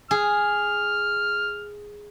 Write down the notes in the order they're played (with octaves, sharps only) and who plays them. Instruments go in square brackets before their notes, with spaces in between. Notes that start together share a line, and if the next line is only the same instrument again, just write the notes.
[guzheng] G#4 [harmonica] F6